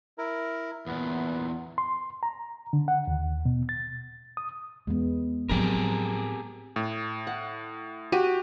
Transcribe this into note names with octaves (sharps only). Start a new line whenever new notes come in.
E4 A#4
E2 A#2 B3
C6
A#5
D3
F#5
D#2
B2
A6
D#6
E2 G#3 B3
A2 F3 F#3 C4 D4 G4 G#4 A#4
A2
F#5
F#4 G4 D#7